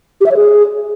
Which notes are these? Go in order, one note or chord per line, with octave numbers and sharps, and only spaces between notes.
G4
E5
C#5
G#4